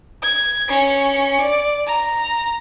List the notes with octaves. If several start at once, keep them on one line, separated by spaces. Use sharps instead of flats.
G#6
C#4 C#7
D5
A#5